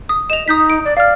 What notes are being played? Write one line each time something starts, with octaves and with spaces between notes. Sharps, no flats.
D#6
D#5 E7 F7
D#4 D#6 G6 B6
D7
D5
D5 F5 F6